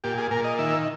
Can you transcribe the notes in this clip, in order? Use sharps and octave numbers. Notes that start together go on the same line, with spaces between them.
A#2 G4
G#4
A#2 A#4
D#5
D#3 E5